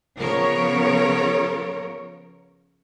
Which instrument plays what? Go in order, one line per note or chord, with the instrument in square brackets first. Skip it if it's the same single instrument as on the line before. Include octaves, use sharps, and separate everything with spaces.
[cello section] C#3 F3 B3 A#4 C#5